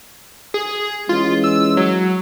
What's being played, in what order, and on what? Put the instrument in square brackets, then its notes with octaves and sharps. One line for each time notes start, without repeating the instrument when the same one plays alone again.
[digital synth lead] G#4
[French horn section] E3 G#3 C#4 [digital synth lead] F4
[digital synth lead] E6
F#3